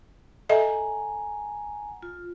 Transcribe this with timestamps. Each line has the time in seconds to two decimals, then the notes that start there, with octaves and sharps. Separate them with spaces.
0.49 A4 D#5 E5 F#5 G#5 A#5
2.02 F4